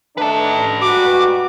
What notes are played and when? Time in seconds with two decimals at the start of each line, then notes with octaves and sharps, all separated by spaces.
0.18 D#3 A3 D4 B4 A5
0.82 G#2 G3 F#4 D6